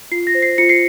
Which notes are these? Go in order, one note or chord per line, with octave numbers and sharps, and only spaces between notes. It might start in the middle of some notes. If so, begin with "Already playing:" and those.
F4 C7
A#6
C5
C7
F4 C#7
C7